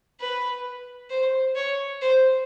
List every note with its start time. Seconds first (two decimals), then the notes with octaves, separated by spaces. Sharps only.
0.20 B4
1.10 C5
1.56 C#5
2.02 C5